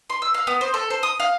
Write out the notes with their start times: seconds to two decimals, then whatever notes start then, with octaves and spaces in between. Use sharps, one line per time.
0.10 C6
0.22 E6
0.34 F5
0.47 B3
0.61 C5
0.74 A4
0.90 C5
1.03 D#6
1.20 F5